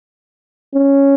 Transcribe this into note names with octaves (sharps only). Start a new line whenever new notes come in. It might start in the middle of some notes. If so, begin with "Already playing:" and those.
C#4